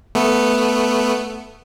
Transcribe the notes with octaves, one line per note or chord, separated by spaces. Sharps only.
A3 B3